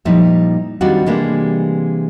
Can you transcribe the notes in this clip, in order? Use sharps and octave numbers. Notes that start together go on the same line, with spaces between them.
A#2 F3 G3 D#4 E4 E5
D#3 G3 C4 D4 F4 F#4
C3 E3 G3 G#3 A#3 D4